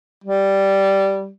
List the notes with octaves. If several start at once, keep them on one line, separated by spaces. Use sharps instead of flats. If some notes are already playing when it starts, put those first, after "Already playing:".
G3